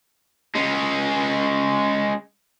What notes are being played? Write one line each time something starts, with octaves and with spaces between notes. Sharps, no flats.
G#3 C#4